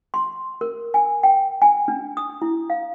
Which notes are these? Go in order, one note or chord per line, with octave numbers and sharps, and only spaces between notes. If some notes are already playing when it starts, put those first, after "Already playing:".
C6
A#4
G#5
G5
G#5
D4
D#6
E4
F5